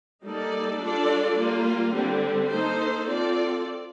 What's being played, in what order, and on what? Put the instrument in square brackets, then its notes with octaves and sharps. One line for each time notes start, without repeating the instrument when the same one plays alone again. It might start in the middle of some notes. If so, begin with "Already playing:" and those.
[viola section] G3 A#3 D#4 A4 D5
G3 D4 F4 A4 D5
G3 A#3 F4
D3 G3 C4
A#3 D#4 A4 C5
C4 F4 A4 D5